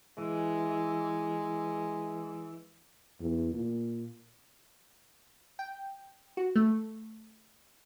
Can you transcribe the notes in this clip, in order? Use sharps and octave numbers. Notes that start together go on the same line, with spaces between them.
E3 G#3
E2
A#2
G5
F#4
A3